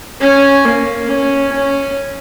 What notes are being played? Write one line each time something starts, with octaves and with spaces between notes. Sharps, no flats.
C#4
A#3
C#4
C#4